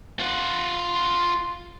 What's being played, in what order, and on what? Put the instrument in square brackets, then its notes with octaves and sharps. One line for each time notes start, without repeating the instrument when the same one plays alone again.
[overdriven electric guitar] F4 F#5